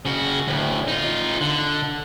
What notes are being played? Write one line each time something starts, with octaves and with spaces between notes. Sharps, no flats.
C#3 F#4
D2 A2
D#4 F4
D3